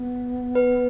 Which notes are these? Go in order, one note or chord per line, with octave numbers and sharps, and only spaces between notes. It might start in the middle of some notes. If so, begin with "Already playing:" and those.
Already playing: B3
B4